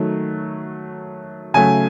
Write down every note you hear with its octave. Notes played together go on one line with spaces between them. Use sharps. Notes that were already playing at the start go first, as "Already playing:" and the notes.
Already playing: D#3 F#3 A3
C#3 F#3 A3 G#5